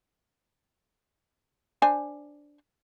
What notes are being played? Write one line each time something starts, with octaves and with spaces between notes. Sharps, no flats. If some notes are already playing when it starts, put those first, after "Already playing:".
D4 C5 G#5